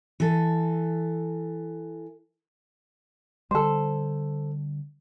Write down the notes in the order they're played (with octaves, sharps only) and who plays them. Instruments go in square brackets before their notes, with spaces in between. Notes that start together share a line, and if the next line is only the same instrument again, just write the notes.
[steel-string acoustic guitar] E3 A4
[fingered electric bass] D3 G3 [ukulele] A4 C5